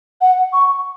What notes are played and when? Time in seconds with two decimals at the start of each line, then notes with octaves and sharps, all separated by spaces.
0.21 F#5
0.53 C#6